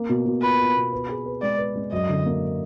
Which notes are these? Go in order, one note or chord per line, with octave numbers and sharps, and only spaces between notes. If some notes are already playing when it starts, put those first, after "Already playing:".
Already playing: A#3
B2
B2
F4 B4
F4
B2
B4
G#4
B4
G#3 D5
B4
G#3
F#2 D#5
D3
A#3